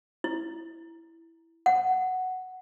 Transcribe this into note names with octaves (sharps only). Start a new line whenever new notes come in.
E4
F#5